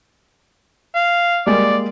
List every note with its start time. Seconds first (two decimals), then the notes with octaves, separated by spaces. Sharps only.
0.95 F5
1.47 G3 G#3 A#3 D5